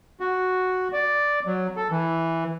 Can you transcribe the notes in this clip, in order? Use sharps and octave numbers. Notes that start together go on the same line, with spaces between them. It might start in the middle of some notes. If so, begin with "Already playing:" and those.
F#4
D5
F#3
A4
E3